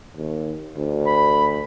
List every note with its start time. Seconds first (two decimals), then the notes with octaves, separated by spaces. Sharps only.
0.17 D#2
0.77 D2
1.07 B5